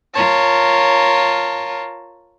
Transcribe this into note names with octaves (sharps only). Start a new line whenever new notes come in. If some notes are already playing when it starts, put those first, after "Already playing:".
F4 A#4 C#5 A5